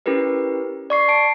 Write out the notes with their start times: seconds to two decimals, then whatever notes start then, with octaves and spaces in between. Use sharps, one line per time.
0.06 C#4 E4 G4 A#4 B4
0.90 D5 C#6 C7
1.08 A5 C7 D7